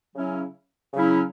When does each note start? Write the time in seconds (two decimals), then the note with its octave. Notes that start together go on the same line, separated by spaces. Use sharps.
0.14 C#3 F#3 C#4 E4
0.94 C#3 F#3 C#4 E4